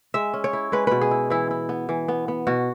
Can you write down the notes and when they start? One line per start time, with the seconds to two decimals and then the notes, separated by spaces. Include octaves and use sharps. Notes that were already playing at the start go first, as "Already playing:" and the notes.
0.14 G#3 E5
0.34 C#4
0.44 C#5
0.53 E4
0.72 G#3 B4
0.87 B2 B4
1.01 G#4
1.11 E4
1.30 E3 E4
1.51 E4
1.69 B3
1.89 E3
2.08 B3
2.28 B3
2.47 B2 F#4